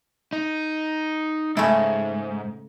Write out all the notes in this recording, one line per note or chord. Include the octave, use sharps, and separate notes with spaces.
D#4
G#2 C#3 A3 E4